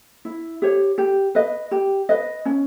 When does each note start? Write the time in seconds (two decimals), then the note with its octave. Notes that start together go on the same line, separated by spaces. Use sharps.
0.25 E4
0.62 G4 C#5
0.98 G4
1.35 B4 D#5
1.71 G4
2.09 B4 D#5
2.45 C#4